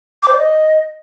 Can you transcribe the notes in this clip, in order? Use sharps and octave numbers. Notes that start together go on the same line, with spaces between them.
D6
C5
D5
D#5